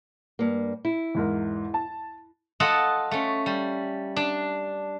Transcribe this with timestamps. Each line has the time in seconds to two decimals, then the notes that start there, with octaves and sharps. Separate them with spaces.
0.39 G2 A#3
0.85 E4
1.15 E2 G#2 A#4
1.74 A5
2.60 F4 A4 D#5 F5 F#5 A5
3.11 A3 C#4
3.46 G3
4.16 D4